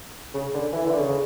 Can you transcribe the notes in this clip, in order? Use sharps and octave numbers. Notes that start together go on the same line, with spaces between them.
C#3
D3
E3
D3
C#3